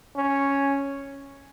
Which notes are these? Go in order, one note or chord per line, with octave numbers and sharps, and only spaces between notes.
C#4